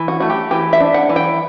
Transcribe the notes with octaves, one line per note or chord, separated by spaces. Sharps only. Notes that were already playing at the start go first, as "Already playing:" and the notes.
Already playing: E3
F#4
A3 F#4
G4
E3 G4
E5
D4
F#5
E3
G5